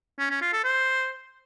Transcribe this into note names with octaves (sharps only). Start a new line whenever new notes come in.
C#4
C#4
F4
A4
C5